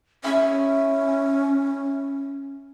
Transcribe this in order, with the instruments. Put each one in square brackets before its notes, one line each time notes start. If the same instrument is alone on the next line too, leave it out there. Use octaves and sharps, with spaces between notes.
[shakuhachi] C#4 [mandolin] E4 G#4 E5